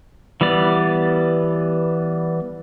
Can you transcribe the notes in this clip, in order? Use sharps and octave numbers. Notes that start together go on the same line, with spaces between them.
E3 G3 B3 D5